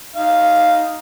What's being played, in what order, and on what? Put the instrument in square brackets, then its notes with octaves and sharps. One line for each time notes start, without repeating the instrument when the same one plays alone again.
[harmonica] D#4 F5